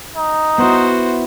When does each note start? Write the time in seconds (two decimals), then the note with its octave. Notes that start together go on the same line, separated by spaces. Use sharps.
0.16 D#4
0.58 B3 E4 F#4 C5